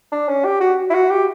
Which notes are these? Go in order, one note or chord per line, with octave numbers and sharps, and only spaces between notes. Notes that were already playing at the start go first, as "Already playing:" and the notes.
D4
C#4
G4
F#4
E4
F#4
G4